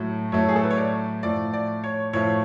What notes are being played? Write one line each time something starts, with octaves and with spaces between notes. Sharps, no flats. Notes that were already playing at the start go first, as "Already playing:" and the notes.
Already playing: A2 F#3 A3
A2 F#3 A3 C#5
G#4
A4
B4
C#5
D5
A2 F3 A3 D5
D5
C#5
A2 F3 A3 C#5